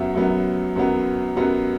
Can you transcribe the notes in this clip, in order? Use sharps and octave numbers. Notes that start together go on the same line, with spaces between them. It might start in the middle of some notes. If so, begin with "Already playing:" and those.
Already playing: F#2 F#3 B3 E5
F#2 F#3 B3
F#2 F#3 B3
F#2 F#3 B3 F#5